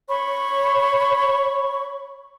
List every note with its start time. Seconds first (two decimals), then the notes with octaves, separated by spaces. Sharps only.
0.09 C#5 B5 C#6